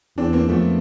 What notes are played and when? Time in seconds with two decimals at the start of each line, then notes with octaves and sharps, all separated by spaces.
0.18 E2 C4 D4
0.33 A#3 C4
0.49 F2 A3 B3